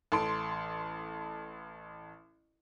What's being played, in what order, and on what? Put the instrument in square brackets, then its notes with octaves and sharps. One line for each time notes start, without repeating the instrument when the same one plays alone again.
[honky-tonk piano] A1 A4 C6 D7